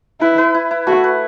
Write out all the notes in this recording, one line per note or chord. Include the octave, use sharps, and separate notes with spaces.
E4 B4
B4
E4
E4
A3 F#4
B4